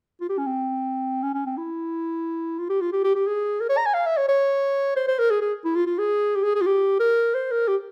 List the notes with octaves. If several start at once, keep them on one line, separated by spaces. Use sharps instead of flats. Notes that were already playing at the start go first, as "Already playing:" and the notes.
F4
G4
C#4
C4
C#4
C#4
C4
E4
F4
G4
F4
G4
G4
G4
G#4
A#4
C#5
A#5
G#5
F5
E5
C#5
C#5
C5
C5
A#4
G#4
G#4
E4
F4
F4
G#4
G4
G#4
G#4
F4
G4
A#4
C5
A#4
G4